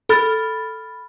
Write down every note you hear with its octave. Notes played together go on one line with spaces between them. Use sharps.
A4 B5 F6 A6